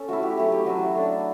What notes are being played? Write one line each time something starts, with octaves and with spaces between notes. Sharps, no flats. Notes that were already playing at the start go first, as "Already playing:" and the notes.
Already playing: C#4 A4
A3 E4 F#4
G4
F#3 A3 E4 G4
G4
F#3 A3 E4 F#4
A3 D4